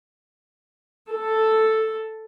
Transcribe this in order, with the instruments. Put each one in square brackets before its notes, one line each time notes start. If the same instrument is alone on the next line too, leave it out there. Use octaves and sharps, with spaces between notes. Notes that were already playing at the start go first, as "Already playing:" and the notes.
[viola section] A4